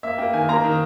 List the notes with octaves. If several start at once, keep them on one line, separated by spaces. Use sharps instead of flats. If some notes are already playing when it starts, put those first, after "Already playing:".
A#3 E5
A#3 G5
D#3 G#5
A#3 A#5
D#3